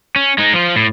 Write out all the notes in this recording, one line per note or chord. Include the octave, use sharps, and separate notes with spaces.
C#4
G#3 D#4
F3 F4
A2